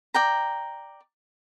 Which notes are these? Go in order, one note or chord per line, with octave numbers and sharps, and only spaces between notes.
D5 G5 A#5